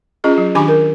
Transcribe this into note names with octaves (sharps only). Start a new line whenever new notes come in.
C#4 F4 G#4 D#5
F#3
D#3 D4 G4 G#5 B5 D6
A#4